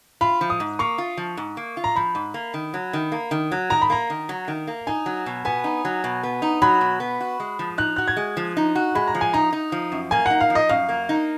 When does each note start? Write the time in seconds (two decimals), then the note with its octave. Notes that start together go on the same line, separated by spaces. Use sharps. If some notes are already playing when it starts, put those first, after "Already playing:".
0.21 F4 B5
0.41 F3
0.50 D#6
0.60 G#2
0.79 A#3 C#6
0.98 F4
1.17 F3
1.37 G#2
1.57 A#3
1.77 F4
1.84 A#5
1.96 F3 B5
2.15 G#2
2.34 A#3
2.54 D#3
2.74 F#3
2.93 D#3
3.12 A#3
3.31 D#3
3.52 F#3
3.70 D#3 A#5
3.82 B5
3.90 A#3 A#5
4.10 D#3
4.29 F#3
4.48 D#3
4.67 A#3
4.87 D#4 G#5
5.06 F#3
5.26 B2
5.45 B3 G#5
5.64 D#4
5.85 F#3
6.04 B2
6.23 B3
6.42 D#4
6.62 F#3 B5
6.81 B2
7.00 B3
7.21 F#4
7.40 G#3
7.59 F3
7.78 D#4 F#6
7.96 F#4 F#6
8.08 G#6
8.17 G#3
8.37 F3
8.57 D#4
8.75 F#4
8.95 G#3 B5
9.07 A#5
9.15 F3
9.21 G#5
9.33 D#4 A#5
9.53 D#4
9.72 F3
9.92 F#2
10.11 A#3 G#5
10.26 D#4 F#5
10.40 F5
10.50 F3
10.55 D#5
10.69 F#2 F5
10.89 A#3
11.09 D#4